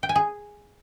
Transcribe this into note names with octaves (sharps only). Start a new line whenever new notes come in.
G5
G#5
G#4